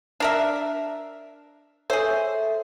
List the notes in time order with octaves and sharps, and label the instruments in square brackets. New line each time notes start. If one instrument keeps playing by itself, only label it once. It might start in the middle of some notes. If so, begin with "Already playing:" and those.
[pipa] D4 A#4 E5
[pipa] G#4 C5 [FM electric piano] A4 C#5 E5